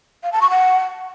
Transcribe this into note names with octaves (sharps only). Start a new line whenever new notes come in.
F5
A5
C#6
F#5